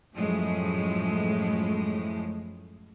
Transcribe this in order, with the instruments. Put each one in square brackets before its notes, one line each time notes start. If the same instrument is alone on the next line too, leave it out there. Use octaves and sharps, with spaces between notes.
[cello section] F#2 A2 F3 G#3 A3